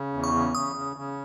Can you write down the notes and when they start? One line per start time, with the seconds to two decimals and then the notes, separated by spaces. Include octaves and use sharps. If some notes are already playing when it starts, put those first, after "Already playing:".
Already playing: C#3
0.13 E2
0.24 C#6
0.34 C#3
0.55 C#3 D#6
0.75 C#3
0.96 C#3